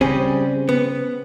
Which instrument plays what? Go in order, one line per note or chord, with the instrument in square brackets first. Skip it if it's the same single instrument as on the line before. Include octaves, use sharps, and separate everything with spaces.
[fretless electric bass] C#3 C4 [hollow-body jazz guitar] G3 C#4 G#4
[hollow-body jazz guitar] B3